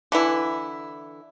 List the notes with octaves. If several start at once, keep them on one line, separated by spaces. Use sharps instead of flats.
D3 E3 E4